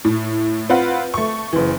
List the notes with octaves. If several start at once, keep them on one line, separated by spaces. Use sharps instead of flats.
A2
C4 F4 B4 F#5
A3 C#6
F#1 E3